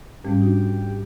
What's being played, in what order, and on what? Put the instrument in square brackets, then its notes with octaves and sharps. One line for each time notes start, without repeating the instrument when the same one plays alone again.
[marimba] G#2 G3 C#4 [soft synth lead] G4
[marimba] D4 F#4